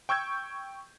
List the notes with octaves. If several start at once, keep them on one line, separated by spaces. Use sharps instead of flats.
G5 C#6 E6 G6 G#6